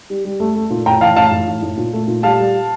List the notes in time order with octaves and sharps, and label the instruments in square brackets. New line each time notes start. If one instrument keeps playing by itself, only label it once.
[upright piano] G3
G3
A3
A3
A#2
A2 G5 A#5
E3 F5 A5
A2 F5 A5
A2
A2
A2
A#2
A3
A#2
G3 F5 A5
G3